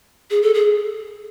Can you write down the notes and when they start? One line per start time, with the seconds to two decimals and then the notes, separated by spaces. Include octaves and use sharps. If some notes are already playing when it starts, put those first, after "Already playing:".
0.31 G#4
0.42 A4
0.54 G#4